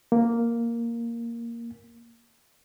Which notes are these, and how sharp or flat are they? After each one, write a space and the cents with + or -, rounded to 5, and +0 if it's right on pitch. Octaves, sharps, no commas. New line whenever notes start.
A#3 +0